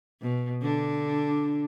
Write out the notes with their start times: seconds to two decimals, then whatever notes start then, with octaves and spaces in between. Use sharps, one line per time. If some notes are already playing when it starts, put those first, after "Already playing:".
0.22 B2
0.62 D3 D4